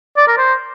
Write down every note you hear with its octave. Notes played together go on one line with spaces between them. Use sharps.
D5
A#4
C5